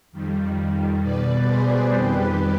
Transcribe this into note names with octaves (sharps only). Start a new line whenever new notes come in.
F2 D#3 G3
B2 G3 B4 D5
G#4 C5
F2 D#3 G3 G4 B4